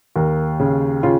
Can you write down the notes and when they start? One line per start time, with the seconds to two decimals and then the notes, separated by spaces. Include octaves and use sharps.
0.16 D#2 A#4
0.60 C#3
1.03 C#3 F4